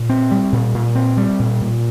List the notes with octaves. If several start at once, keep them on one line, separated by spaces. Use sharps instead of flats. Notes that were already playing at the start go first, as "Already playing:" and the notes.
Already playing: A#2
C4
G3
A#2
A#2
C4
G3
A#2
A#2